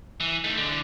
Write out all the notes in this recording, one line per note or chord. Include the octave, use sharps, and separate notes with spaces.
E3
A3 D#4
D3 E3